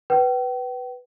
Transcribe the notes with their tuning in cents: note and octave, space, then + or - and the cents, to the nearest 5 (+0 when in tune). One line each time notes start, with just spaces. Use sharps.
B4 +0 G5 -40